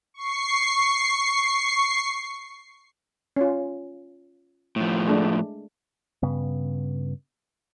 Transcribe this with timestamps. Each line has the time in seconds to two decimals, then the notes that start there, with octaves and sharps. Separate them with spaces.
0.14 C#6 C7
3.36 C#4 F4
4.76 A2 F3
5.08 G#3 A3 D4
6.22 G2 C#3 B3